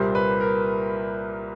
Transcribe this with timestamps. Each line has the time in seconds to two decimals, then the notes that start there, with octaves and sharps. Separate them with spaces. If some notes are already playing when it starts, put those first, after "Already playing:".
Already playing: C2 A#2 G3 A#3 C5
0.15 B4
0.41 A#4